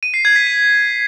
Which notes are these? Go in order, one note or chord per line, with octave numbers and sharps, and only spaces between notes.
D#7
C7
G#6
B6
D#7